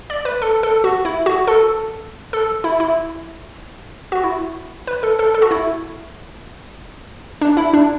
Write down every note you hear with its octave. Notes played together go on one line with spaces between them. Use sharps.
D5
B4
A4
A4
F#4
E4
F#4
A4
A4
E4
E4
F#4
E4
B4
A4
A4
A4
F#4
E4
D4
E4
D4